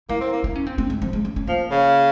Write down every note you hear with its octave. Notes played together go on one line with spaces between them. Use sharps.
A#3 E4
C4
A#3
E4
C#4
C4
C4
G#3
F3
G#3
C#4
C#4
F3 A#3
C#3